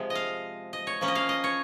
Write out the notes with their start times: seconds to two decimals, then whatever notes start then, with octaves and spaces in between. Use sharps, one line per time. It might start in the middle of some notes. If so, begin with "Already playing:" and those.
Already playing: C3 F3 G#3
0.10 D#5
0.15 F5
0.73 D#5
0.87 C#5
1.01 F3 A#3 C#4
1.08 D#5
1.15 F5
1.29 D#5
1.44 C#5